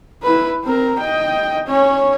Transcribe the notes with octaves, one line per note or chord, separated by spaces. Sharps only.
E4 B4
C4 A#4
D#5 G5
C#4 C#5